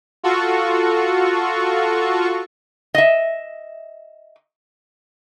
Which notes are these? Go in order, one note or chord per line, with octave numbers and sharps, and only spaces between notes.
F4 F#4 A4 C#6
D#5 E5